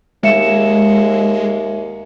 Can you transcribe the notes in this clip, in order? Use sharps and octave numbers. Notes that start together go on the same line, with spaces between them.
D#2 G#3 E5 C#7 E7